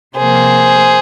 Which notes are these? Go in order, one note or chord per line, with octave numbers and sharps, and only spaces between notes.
C3 F3 A#3 G#4 C5